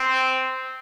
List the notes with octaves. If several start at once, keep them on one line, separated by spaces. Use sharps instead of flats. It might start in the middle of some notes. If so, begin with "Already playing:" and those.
Already playing: C4